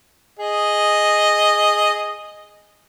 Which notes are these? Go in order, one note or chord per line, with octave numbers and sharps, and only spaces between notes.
G#4 D#5